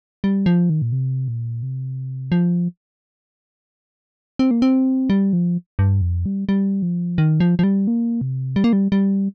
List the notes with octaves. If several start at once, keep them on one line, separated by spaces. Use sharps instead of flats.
G3
F3
D#3
A#2
C3
A#2
C3
F3
C4
A#3
C4
G3
F3
G2
F2
G3
G3
F3
D#3
F3
F3
G3
A#3
C3
G3
A#3
G3
G3